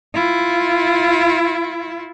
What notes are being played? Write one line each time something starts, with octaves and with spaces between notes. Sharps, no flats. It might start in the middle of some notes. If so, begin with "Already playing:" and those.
E4 F4